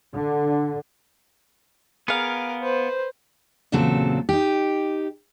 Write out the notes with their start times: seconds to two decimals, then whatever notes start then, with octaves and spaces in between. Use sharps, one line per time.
0.15 D3
2.08 B3 G#4 A#4 F5 D6
2.63 B4 C5
3.72 E2 A#2 C#3 F#3 C4 A4
4.29 D#4 G4